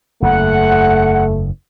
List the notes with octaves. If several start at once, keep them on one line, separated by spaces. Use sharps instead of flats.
F#1 E2 A3 F#5